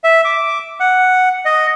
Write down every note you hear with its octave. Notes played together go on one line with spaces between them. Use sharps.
E5
D6
F#5
D#5